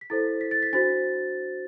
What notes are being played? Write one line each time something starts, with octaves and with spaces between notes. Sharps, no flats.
B6
E4 A4 C5 A6
B6
A6
B6
D4 F#4 C5 A6